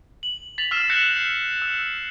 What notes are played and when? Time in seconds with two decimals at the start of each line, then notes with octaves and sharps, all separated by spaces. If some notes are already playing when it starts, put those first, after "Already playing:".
0.23 F#7
0.58 A6 B6 F7 F#7
0.71 E6 F6 B6 C7 E7
0.90 F#6 G6 A#6 B6 C#7 E7
1.17 C7
1.62 E6